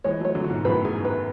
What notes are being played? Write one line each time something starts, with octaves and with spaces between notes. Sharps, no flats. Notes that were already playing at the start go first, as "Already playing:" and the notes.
E3 G#3 C#5
F#3 A3 C#5
D3 F#3
F#4
G#2 B2
F#2 A2 B4
G#4
G#2
B4